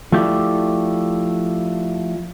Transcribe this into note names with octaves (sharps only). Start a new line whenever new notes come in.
F3 A3 E4 G4 D5